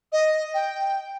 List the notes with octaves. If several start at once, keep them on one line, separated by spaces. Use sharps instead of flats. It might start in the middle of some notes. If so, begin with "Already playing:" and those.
D#5
G5